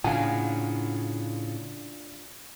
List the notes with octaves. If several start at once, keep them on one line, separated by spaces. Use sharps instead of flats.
A2 C#3 D4 F4 F5 F#5 G#5